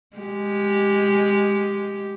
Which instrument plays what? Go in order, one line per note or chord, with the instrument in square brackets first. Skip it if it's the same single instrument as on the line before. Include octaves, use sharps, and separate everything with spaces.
[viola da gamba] G#3 G4